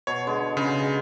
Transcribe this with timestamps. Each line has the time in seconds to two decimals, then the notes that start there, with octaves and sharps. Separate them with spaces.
0.07 B2 C#5
0.27 D3 G#3
0.57 C#3